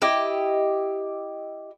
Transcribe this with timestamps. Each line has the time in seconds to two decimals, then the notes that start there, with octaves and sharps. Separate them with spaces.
0.02 E4 G4 D#5